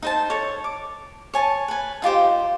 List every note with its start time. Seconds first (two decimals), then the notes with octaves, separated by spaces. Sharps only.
0.02 D#4 C5 A5
0.30 A4 C#5
0.64 D6
1.34 C#5 G#5 A5
1.68 B4 G#5
2.02 D#4 F4 G4 C5